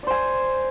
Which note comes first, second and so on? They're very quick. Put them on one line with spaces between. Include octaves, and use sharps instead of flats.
D5 C5 G#5